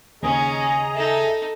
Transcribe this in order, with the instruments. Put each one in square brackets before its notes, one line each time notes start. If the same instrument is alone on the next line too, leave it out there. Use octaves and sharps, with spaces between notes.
[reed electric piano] D#2 C#3 [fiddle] C#4 [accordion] G#4 D#5 A#5 [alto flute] G#5
[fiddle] D#4 A4 [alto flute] E5